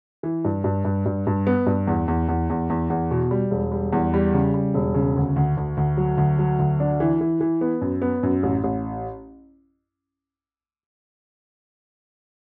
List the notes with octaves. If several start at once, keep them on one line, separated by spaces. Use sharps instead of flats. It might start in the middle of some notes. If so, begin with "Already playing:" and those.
E3
G2
G2
G2
G2
G2
B3
G2
E2
E2
E2
E2
E2
E2
B2
G3
E1
G3
E2
G3
C#3
G3
E1
C#3
D2
D2
D2
D2
F#3
D2
F#3
D2
D4
E3
E3
E3
B3
F#2
B3
F#2
A1
A1